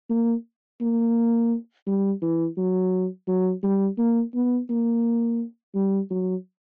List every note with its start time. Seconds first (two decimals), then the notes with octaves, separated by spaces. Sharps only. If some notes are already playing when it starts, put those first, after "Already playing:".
0.10 A#3
0.81 A#3
1.87 G3
2.22 E3
2.57 F#3
3.27 F#3
3.63 G3
3.98 A#3
4.34 B3
4.70 A#3
5.75 G3
6.11 F#3